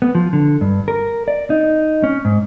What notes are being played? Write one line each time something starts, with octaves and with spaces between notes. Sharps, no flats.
B3
F3
D3
G2
A#4
D5
D#4
C#4
G#2